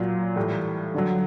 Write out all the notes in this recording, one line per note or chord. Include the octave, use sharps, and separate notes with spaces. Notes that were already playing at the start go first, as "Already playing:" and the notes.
Already playing: A#2 F#3 F4
A2 E3 G3
D3 F#3